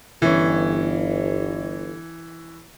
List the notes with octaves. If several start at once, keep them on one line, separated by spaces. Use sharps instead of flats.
G1 E3 C#4